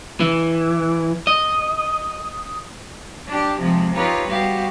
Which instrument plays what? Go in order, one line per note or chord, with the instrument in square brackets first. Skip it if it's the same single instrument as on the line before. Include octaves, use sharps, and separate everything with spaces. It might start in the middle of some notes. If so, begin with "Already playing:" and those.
[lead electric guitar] E3
D#5
[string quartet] D4 G4
C3 F3 G#3
D#4 F4 G4 B4 C#5 A#5
G3 B3 F#4 G4 F5